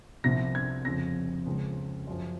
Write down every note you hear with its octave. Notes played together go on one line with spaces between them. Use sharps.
C2 C3 F3 A#6
G#6
F2 C#3 F3 A#6
C#2 C#3 F3
F#2 F3